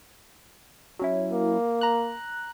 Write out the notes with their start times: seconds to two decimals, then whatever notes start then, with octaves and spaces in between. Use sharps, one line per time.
0.99 F#3 C#4 E4
1.32 A#3
1.81 A#5 F#6